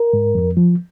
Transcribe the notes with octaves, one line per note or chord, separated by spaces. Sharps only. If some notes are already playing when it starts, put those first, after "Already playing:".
Already playing: A#4
G#2
F2
F3